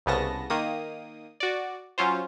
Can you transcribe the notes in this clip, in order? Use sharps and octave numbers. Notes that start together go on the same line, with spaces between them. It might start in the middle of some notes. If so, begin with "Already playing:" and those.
C2 C#3 B3 A5 A#6
D#3 A#3 D#6
F#4 D5
F#3 C#4 F4 C5